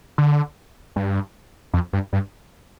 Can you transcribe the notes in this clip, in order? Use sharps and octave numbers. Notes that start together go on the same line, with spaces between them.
D3
G2
F2
G2
G2